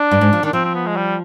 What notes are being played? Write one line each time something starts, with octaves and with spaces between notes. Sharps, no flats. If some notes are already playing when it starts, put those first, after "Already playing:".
Already playing: D4
G2
G#2
F3
D#3 D4
F3 C4
C4
B3
G#3
G3